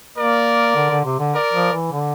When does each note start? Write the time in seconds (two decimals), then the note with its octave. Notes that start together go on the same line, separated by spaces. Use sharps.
0.17 A#3 A#4 D5
0.75 D3
0.90 D3
1.05 C3
1.19 D3
1.33 A#4 D5
1.53 F3
1.72 E3
1.92 D3